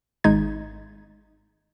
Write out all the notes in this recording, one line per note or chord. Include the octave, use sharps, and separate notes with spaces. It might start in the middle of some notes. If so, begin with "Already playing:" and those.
G#1 G#3 D#4 G#6